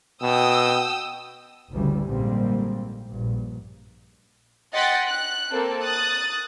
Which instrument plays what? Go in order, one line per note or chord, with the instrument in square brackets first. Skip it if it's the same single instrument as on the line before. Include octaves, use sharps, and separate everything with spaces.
[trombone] B2 [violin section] G5 D#6 E6
[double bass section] G1 D2 C#3 E3 G3
A#1 G#2 D3 G3 A#3 C4
A#1 G2
[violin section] D#5 F#5 G5 C6 A6 B6
F#6
A#3 C4 A4
D#6 F#6 A6